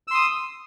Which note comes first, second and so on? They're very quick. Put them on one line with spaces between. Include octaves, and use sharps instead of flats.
E6 C6 D#6